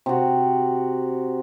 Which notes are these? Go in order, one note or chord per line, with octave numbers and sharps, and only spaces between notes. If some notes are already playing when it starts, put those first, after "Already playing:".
C3 F#4